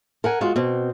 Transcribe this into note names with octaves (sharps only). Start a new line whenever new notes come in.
A#4 F#5 G#5
G#3 B3 F4 F#4
B2 C4